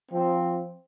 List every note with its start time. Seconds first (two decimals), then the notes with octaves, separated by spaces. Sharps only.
0.11 F3 C4